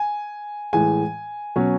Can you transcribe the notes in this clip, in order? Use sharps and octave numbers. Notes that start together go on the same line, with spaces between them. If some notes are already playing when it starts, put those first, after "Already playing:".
Already playing: G#5
A2 E3 G#3 G#5
B2 F#3 C#4